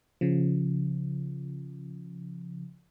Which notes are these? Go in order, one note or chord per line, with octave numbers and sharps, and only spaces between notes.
C#3 F3